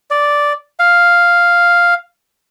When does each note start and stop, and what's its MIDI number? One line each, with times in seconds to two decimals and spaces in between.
0.11 0.53 74
0.79 1.94 77